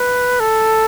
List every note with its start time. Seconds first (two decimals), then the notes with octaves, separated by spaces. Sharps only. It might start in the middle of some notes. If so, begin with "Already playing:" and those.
Already playing: B4
0.40 A4